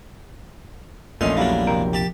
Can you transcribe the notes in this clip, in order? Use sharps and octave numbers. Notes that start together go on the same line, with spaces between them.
A#1 E2 A#2 A3 C#4 D#4 C6
F#3 G3 A#3 D4 E4
F2 C3 A#4
G4 A5